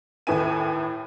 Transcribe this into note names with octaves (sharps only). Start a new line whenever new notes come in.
D#2 A2 B4 E5 G#5 D#7